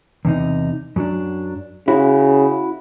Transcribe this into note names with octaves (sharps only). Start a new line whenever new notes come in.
E2 C3 D#4
F#2 F#3 D4
C#3 E4 F#4